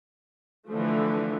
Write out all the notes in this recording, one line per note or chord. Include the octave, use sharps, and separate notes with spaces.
D3 E3 F3 A3